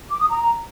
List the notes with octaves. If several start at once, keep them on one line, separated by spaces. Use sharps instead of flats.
D6
D#6
A#5